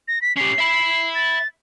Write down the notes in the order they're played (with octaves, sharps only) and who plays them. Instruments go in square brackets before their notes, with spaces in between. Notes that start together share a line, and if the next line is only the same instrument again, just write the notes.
[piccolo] A#6
B6
[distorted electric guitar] C#4 G4 [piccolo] C7
[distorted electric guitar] E5 B5
[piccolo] A6